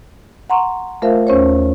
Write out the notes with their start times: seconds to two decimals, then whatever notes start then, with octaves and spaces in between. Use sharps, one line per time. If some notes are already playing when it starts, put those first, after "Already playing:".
0.50 F#5 A#5 C6 C#6
1.02 A3 F4 A#4 C5 E5 F5
1.27 D#2 C#4 C5 C#5